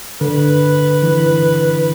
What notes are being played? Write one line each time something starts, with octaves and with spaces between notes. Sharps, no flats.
D3 B4
E3